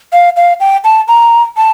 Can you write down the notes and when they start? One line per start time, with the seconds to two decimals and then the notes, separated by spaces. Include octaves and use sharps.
0.13 F5
0.36 F5
0.60 G5
0.84 A5
1.08 A#5
1.57 A5